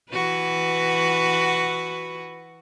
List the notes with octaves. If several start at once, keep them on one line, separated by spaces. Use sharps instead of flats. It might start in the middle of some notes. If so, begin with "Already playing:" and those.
E3 F#4 B4